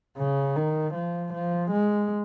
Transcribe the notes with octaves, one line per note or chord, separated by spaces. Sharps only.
C#3
D#3
F3
F3
G#3